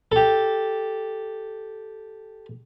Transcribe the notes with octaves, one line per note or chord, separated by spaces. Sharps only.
G4 A4